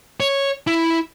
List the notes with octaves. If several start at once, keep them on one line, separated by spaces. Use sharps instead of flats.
C#5
E4